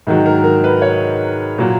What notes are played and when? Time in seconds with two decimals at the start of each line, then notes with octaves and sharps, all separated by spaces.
0.07 G#2 D#3 F#3
0.26 A#4
0.44 A#4
0.64 B4
0.82 C#5
1.58 A#2 F#3